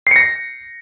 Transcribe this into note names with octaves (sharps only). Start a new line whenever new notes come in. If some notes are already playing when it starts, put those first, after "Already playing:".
A#6 C7 C#7